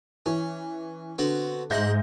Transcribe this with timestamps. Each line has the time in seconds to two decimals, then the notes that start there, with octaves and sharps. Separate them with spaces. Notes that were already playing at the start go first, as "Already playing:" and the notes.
0.26 E3 C#4
1.18 D3 B3 C4 F#4
1.70 G#2 G#3 C5 E5 F#5 G6 A#6